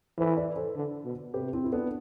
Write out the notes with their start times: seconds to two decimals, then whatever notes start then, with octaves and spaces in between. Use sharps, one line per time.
0.18 E3 A4 C5
0.37 B4 D5
0.56 A4 C5
0.76 D3
1.05 B2
1.34 C3 G4 B4
1.53 C4 E4
1.64 E4
1.73 B3 D4